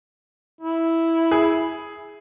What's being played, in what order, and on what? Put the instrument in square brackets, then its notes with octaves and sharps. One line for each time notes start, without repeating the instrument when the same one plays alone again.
[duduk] E4
[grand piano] G#4